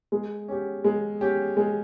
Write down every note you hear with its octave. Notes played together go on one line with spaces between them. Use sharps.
G#3
C#4 G4
G#3
C#4 G4
G#3